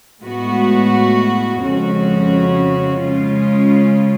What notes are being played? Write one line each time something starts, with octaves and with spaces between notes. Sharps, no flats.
A2 G#3 B3 F#4
F2 C#3 G#3 C#4 F#4
C#3 G#3 C#4 F4